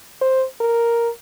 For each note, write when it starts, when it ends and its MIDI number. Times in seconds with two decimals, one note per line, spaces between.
0.21 0.45 72
0.61 1.09 70